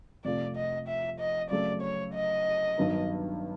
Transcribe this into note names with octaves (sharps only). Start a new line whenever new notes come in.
F2 C3 F3 A3 D5
D#5
E5
D#5
C#3 F#3 A3 D5
C#5
D#5
G2 D#3 F#3 B3 D#4